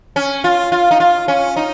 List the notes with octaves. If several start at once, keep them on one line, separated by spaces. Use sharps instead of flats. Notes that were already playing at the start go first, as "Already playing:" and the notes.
C#4
F4
F4
D#4
F4
C#4
D#4